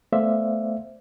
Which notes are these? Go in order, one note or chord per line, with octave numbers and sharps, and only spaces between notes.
A3 B3 C5 D5 E5 F5